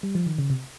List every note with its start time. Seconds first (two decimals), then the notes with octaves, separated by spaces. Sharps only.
0.03 G3
0.15 F3
0.26 D#3
0.38 C#3
0.50 C3